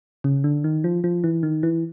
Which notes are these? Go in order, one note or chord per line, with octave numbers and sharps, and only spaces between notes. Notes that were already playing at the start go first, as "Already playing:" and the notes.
C#3
D3
D#3
F3
F3
E3
D#3
E3